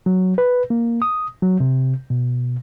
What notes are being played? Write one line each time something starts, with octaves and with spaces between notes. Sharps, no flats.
F#3
B4
A#3
D#6
F#3
C3
B2